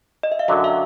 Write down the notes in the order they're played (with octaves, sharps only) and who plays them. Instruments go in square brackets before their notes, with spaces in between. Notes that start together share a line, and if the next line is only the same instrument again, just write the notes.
[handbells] D#5
E5
F5
[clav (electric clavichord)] F#2 D3 F#3 [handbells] E5 F#5
[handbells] E5 F#5